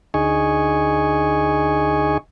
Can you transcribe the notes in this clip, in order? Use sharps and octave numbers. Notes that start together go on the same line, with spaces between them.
D2 D#4 G#4 D#5 G#5 C#6